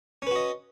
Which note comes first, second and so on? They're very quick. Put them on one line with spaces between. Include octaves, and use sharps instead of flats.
C#4 B4 F#4 D#5